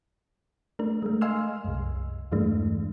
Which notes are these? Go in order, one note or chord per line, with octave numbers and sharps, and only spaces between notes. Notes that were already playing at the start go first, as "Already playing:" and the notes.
A3 D4 A#4
G#3 A3
D#5 F5 G#5 C6 E6 F6
C2 F#2
E2 G2 E3 G#3 A3 D4